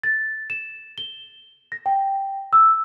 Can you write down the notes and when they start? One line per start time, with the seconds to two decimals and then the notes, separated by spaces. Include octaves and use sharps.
0.03 A6
0.50 E7
0.98 G7
1.72 A#6
1.86 G5
2.53 E6